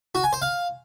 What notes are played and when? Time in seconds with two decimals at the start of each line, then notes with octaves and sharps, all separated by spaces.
0.15 F#4
0.24 G#5
0.33 C5
0.42 F5